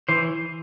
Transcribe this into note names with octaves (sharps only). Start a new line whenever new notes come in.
E3 C5